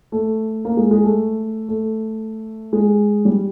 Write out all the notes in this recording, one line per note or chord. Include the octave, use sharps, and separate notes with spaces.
A3
A#3
G#3
G#3
A3
A3
G#3
G3